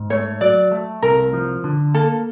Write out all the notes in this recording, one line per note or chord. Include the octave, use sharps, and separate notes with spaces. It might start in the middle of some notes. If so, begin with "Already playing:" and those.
Already playing: G#2
A3 C#5
F#3 D5
A3
C2 A#4
F3
D3
A#3 A4